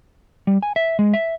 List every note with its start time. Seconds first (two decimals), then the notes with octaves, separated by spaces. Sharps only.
0.47 G3
0.63 G#5
0.76 E5
0.99 G#3
1.14 E5